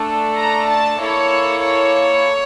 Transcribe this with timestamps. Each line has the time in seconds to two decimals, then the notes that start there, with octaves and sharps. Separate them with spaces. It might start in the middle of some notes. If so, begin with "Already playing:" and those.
Already playing: A3 D4 A4
0.36 A#5
0.68 A5
1.00 A#3 E4 A4 C#5
1.64 C#5